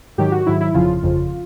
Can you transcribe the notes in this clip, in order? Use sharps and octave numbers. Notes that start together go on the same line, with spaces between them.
G#2 D#3 F#3 G4
F#4
G#2 D#3 F#3 E4
E4
G1 F2 C#3 F3 F4
G1 F2 C#3 F3